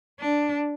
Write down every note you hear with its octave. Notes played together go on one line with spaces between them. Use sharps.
D4